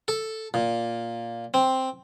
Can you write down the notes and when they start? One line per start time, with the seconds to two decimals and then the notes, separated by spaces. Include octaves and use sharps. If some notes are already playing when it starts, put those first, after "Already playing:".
0.08 A4
0.54 A#2
1.54 C4